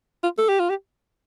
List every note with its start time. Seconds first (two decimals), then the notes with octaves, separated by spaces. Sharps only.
0.23 F4
0.38 A4
0.49 G4
0.60 F4
0.70 G4